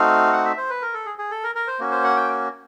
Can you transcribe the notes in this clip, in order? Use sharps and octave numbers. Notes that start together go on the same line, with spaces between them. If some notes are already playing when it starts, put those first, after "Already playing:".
Already playing: A3 C4 D#4 F#4 F5
F#5
E5
C5
B4
A#4
A4
G#4
G#4
A4
A#4
A#4
C5
A#3 C#4 F#4
C5
F#5
G5